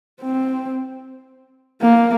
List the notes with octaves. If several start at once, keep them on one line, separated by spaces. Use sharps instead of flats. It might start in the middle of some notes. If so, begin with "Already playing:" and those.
C4
A#3